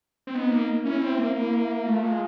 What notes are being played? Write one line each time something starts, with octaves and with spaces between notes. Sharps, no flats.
C4
B3 D#4
A#3
C#4 E4
C4
A#3
A#3 E4
A3 F4
G#3